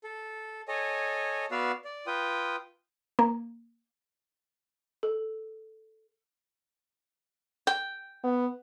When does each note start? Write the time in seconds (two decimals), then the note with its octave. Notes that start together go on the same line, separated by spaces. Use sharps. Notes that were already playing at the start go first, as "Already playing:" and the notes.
0.04 A4
0.68 A4 C#5 D#5 G#5
1.51 B3 F#4 B4 D5 F5 E6
1.85 D5
2.07 F4 B4 G5 D#6
3.19 A#3
5.03 A4
7.67 G5
8.24 B3